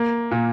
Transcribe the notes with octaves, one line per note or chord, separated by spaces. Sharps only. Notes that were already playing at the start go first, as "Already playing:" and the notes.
Already playing: A#3
A#2